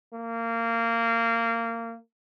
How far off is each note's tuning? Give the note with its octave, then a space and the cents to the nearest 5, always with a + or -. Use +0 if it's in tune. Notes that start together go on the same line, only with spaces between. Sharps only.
A#3 -20